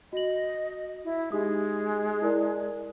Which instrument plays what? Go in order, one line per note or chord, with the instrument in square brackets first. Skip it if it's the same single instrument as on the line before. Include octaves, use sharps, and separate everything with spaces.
[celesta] F#4 F#7 [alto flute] D#5
[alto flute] E4
[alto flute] G#3 [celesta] D#4 G4 D#6
[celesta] E4 A#4 D5